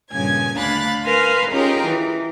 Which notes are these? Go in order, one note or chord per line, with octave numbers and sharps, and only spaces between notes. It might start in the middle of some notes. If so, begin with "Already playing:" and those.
G2 A#2 C#3 G#5 G#6
D2 D4 F5 B5 F#6 A6
A#4 B4 F5 G#5 B5 C6
C#4 D#4 F4 G4 G#4 A#4
E3